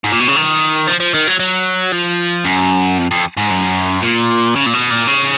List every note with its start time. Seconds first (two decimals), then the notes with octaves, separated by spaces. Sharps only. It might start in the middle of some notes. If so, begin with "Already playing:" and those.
0.04 G#2
0.12 A#2
0.20 B2
0.27 C#3
0.35 D#3
0.88 F3
1.00 F3
1.14 D#3
1.27 F#3
1.40 F#3
1.92 F3
2.45 F#2
2.98 F2
3.11 F2
3.37 G#2
3.50 F#2
4.02 A#2
4.56 C#3
4.66 A#2
4.74 B2
4.91 A#2
5.07 C#3